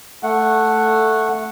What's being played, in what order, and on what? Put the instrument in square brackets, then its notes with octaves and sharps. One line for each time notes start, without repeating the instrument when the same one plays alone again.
[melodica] A3 F#5